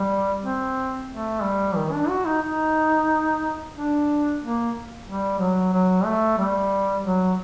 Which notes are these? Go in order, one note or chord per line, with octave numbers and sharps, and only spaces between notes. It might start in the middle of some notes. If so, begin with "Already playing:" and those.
Already playing: G3
C4
A3
G3
D#3
D4
F#4
D#4
D#4
D4
A#3
G3
F#3
F#3
A3
G3
F#3